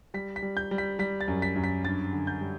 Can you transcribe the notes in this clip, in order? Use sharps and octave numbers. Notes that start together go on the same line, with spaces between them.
G3 B6
B6
G3
G6
G3
B6
G3 B6
A6
F#2
B6
F#2
B6
G2 A6
D3
G6
G3